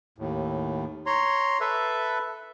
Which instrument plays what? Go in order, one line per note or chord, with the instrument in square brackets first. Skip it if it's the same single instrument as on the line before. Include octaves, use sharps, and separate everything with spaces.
[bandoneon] D#2 A2
C#5 A#5 C6
A4 B4 E5